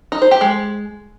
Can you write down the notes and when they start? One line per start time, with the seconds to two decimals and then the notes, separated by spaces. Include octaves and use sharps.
0.12 D#4
0.22 C5
0.31 G4
0.41 G#3